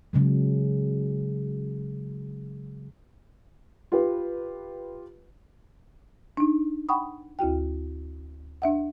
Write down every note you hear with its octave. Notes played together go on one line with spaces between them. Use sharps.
C#3 F#3 G#3
F4 G4 B4
D4 D#4
F#5 G5 B5 C#6 D#6
D2 E4 F#4 G5
D4 E5 F#5